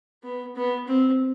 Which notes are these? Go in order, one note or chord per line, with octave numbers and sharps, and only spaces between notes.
B3
B3
C4